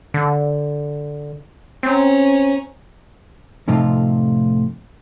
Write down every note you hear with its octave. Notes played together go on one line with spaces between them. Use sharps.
D3
C4 C#4 A#5
F2 A2 C3 F3 D#4 F4